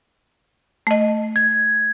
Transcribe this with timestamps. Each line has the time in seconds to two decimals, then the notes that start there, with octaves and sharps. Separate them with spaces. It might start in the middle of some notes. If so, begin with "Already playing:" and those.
0.87 A3 D#5
1.36 G#6